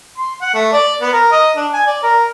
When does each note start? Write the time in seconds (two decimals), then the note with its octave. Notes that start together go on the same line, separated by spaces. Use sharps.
0.18 C6
0.41 F#5
0.54 A3
0.73 D5
1.01 B3
1.13 A#4
1.32 D#5
1.56 D4
1.74 G#5
1.87 D5
2.03 A#4